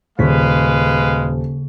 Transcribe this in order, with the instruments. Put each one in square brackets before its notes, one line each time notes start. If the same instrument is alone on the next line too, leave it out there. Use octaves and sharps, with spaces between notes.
[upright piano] D#1 [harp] C#3 B6 [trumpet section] G#3 B4 F5